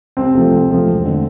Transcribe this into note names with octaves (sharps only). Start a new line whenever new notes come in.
C2 C4
C3 F3 A3
C2
C3 F3 A3
E1
D3 A3